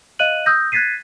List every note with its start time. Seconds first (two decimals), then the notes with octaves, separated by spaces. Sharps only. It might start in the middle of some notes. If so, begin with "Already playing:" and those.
0.19 D#5 F5 F#6 D#7 F#7
0.46 D#6 E6 G6 A#6
0.72 F#6 G#6 A6 B6 C7 D#7